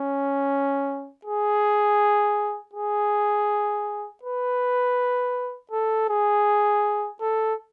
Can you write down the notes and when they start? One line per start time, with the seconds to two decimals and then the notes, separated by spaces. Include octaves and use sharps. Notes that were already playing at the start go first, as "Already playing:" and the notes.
Already playing: C#4
1.25 G#4
2.74 G#4
4.23 B4
5.71 A4
6.09 G#4
7.21 A4